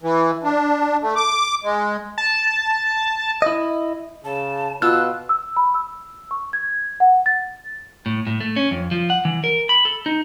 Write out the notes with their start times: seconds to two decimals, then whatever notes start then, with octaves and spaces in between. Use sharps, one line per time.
0.02 E3
0.44 D4
1.02 A3
1.16 D6
1.64 G#3
2.18 A5
3.42 E4 D#5
4.25 C#3 A5
4.82 B2 F4 E6 F#6
5.29 E6
5.57 B5
5.74 E6
6.31 C#6
6.53 G#6
7.00 F#5
7.26 A6
8.06 A2
8.27 A2
8.40 A3
8.56 C#4
8.71 F2
8.91 F3
9.10 F#5
9.25 E3
9.44 A#4
9.69 B5
9.85 A4
10.06 D#4